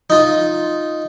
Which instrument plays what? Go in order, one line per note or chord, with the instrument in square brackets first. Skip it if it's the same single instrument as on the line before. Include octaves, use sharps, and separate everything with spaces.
[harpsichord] D#4 F4